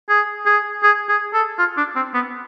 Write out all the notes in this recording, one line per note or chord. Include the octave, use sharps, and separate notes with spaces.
G#4
G#4
G#4
G#4
A4
F4
D4
C4
B3